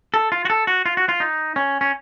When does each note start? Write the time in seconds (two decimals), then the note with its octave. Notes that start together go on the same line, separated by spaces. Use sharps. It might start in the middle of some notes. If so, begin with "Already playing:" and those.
0.14 A4
0.32 F4
0.45 F#4
0.50 A4
0.67 F#4
0.86 F4
0.97 F#4
1.09 F4
1.20 D#4
1.56 C#4
1.81 C#4